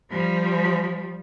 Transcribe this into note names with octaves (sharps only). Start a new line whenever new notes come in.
F3 G3